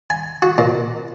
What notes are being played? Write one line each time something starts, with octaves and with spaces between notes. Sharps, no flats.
G#5
F#4
A#2